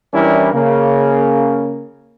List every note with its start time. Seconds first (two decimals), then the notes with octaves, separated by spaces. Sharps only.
0.13 E3 G3 C#4 D4 E4 A#4
0.53 C#3 A#3